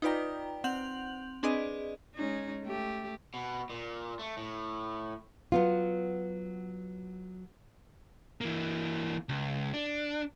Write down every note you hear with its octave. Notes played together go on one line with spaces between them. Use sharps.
D#4 F4 B4 D5 G5 A#5
C4 F#5 C6 G6 F7 F#7
C4 D4 G#4 B4 D5 D#5
G#3 C#4 D#4
A3 G4
B2
A#2
A3
A2
F#3 B3 F4
E3 A#3
C#2
D4